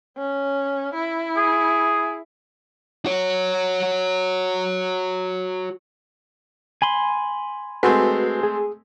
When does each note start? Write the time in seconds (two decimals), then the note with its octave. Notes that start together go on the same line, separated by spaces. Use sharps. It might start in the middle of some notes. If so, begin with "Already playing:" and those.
0.18 C#4
0.95 E4
1.37 G#4
3.06 F#4 C#5
6.82 G#5 B5 C6
7.83 G#3 A3 C4 F#4 B4
8.43 G#4